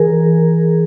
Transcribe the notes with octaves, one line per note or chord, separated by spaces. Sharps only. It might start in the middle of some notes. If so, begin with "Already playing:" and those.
Already playing: E3 G#4 A#4